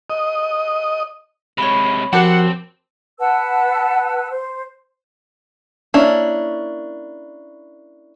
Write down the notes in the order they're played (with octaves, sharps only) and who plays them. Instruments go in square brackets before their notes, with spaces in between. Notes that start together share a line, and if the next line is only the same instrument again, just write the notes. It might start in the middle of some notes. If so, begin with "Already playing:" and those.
[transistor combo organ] D#5
[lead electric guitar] C3 G#3 [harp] C#5 B5
[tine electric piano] F3 F#4 A#4 [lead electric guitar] C4 [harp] G4 A5 [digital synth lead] F#5
[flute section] B4 F#5 A5 E6
C5
[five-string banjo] A#3 C#4 D4 E4